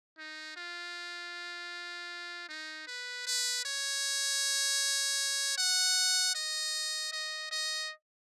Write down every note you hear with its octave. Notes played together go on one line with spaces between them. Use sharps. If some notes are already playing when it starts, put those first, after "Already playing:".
D#4
F4
D#4
B4
B4
C#5
F#5
D#5
D#5
D#5